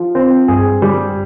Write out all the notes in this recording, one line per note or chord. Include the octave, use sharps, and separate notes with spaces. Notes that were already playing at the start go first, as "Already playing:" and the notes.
Already playing: F3
C4
G2 G#4
G3